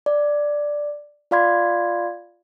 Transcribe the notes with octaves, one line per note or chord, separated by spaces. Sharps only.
D5
F4 D5 F5 B5 C6 G#6